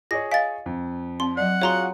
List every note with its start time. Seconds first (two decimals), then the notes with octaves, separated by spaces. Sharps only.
0.11 F4 G#4 C#5 D#5 A#6
0.32 D#5 F5 G#5 A6 B6
0.66 F2
1.20 C4 C6
1.37 F#3 D5 F#5
1.62 F4 F#4 G#4 C#5 A#5 C6